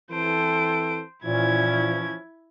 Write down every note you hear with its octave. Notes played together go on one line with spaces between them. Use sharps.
E3 C4 A4 C5 D7
A#2 E3 F3 C#4 E4 G#6